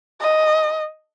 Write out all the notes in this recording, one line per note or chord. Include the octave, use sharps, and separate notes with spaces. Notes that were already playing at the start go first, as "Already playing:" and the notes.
D#5